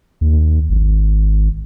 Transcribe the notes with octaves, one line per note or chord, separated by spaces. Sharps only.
D#2
G#1